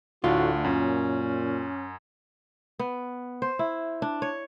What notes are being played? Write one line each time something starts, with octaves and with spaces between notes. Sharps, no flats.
D2 A2 D4 F4 F#4
F#2 A#2 C#4
B3
C5
E4
D4
C#5